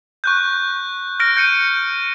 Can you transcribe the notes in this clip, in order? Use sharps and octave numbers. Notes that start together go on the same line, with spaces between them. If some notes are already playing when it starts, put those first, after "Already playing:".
C#6 F#6 G6
F6 A#6 D7
G6 C#7 D#7